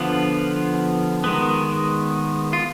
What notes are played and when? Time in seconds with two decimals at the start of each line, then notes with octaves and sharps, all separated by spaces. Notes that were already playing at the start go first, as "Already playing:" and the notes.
Already playing: D3 F3 B3 F4
1.24 D#3 G#3 B3
2.53 F4